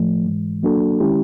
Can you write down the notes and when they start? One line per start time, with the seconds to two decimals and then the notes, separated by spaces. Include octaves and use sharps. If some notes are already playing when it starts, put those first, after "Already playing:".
Already playing: A2 F3 A3
0.25 G#2 E3 G#3
0.63 F#3 A#3 D4 F#4 A4
1.00 D#3 G#3 C#4 E4 G4